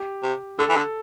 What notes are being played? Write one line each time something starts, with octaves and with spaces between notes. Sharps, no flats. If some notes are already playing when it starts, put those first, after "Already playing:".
Already playing: G4
C3
D3 A4
E3
D3